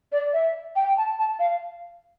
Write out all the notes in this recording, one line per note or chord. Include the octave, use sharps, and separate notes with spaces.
D5
E5
G5
A5
A5
F5